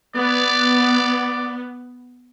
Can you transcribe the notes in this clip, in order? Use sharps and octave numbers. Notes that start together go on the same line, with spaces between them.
B3 D5